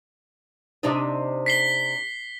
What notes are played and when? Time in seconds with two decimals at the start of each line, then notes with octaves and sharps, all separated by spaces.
0.83 C3 D4 D#4
1.46 B6 C7 G7